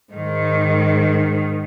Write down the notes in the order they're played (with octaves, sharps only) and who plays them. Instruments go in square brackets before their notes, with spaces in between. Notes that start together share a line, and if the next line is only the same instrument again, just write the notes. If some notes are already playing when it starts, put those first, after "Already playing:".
[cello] G#2 D#3